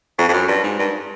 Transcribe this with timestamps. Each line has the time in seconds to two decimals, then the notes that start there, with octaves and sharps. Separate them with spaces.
0.18 F2
0.28 F2
0.33 F#2
0.48 G2
0.63 G#2
0.79 G2